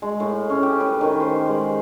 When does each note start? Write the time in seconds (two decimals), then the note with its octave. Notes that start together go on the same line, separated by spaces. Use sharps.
0.02 G#3
0.20 A2
0.50 C#4
0.63 G4
0.80 B4
1.01 D#3
1.20 C5
1.47 G#3